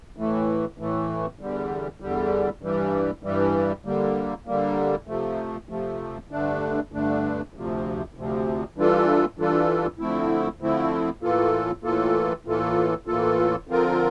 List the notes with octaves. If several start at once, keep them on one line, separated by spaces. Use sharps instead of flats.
A2 E3 A3
A2 E3 A3
E2 D3 G3
E2 D3 G3
G2 E3 G3
G2 E3 G3
D3 G3 A#3
D3 G3 A#3
C3 F3 A3
C3 F3 A3
G2 D3 A3 D4
G2 D3 A3 D4
D2 C3 F3
D2 C3 F3
E3 G3 D4 F4 A4
E3 G3 D4 F4 A4
D3 F3 A3 C4 E4
D3 F3 A3 C4 E4
A2 E3 A#3 F4 A4
A2 E3 A#3 F4 A4
A2 E3 A#3 F4 A4
A2 E3 A#3 F4 A4
D3 F3 C4 F4 A#4